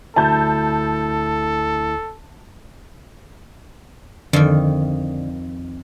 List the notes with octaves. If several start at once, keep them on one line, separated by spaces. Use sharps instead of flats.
D2 E4 A4 A5 G6
F2 D3 D#3